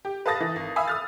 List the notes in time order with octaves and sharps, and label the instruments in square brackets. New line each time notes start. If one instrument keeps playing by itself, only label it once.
[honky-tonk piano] G4
B4 F5 A5 D#6 A6 A#6
E3
G#1
E5 F5 G#5 B5 D#6 E6
D#6 F6 A6